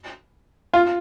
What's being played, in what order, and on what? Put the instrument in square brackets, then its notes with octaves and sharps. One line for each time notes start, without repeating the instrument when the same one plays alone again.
[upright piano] F4 F5